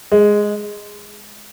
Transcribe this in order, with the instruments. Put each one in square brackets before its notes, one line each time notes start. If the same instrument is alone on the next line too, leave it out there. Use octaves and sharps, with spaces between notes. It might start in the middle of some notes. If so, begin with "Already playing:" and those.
[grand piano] G#3